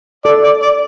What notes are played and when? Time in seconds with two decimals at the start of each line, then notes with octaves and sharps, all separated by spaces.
0.25 A4 D5
0.44 D5
0.62 D5